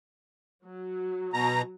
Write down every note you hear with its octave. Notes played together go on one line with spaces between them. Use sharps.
F#3
B2 A#5